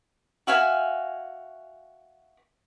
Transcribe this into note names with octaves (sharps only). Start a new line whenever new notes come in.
F#4 E5 F5 G#5